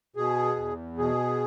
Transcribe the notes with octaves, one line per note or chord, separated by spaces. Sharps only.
B2 G#4
E2
B2 G#4